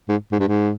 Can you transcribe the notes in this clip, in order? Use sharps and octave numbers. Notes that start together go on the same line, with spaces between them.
G#2
G#2
G2
G#2